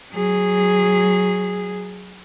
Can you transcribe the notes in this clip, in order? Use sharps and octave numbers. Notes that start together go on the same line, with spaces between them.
F#3 G#4